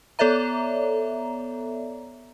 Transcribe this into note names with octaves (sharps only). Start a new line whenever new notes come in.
B3 A4 C#5 D5 E5 A#5